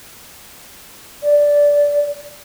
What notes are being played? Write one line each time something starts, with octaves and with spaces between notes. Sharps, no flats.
D5